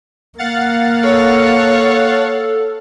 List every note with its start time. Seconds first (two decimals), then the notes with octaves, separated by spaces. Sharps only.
0.38 A#3 F5 F#5 A6
1.03 A4 C#5